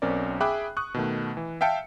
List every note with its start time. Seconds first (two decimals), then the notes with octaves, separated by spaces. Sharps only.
0.02 B1 C4 C#4 A#4 D5
0.41 G#4 E5 G5 B5 D6 F#6
0.77 C#6 D#6 F#6
0.94 B2 D#3 A3
1.37 E3
1.61 E5 F5 G5 A5 E6 C#7